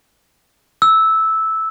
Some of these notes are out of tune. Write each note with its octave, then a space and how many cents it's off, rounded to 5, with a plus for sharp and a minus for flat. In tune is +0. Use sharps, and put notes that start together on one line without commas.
E6 -10